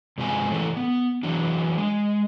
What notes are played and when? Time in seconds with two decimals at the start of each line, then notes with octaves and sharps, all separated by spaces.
0.18 G2 C3 F3 G#3 G#5
0.50 A2 C#3 E3 A4
0.77 B3
1.23 E3 F#3 D4
1.78 G#3